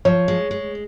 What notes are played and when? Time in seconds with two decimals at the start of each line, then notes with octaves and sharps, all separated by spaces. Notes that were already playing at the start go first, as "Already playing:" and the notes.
0.05 F3 C#5
0.28 G#3
0.51 G#3